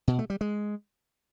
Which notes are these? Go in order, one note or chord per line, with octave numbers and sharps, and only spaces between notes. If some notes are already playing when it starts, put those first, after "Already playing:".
B2
A3
G3
G#3